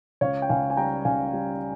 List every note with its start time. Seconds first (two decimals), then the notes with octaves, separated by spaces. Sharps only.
0.21 C#2 C#5 F5
0.42 G5
0.49 C#2 F5 G#5
0.70 G#5
0.77 G3 G5 A#5
1.05 C#2 F5 G#5
1.33 G3